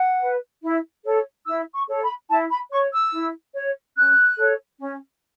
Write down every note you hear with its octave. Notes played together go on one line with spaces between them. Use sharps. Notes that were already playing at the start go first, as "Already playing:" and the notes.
Already playing: F#5
B4
E4
A4 C#5
E4 E6
C#6
A4 C#5
B5
E4 A5
B5
C#5 C#6
E6
E4
C#5
C#4 F#6
A4 C#5
C#4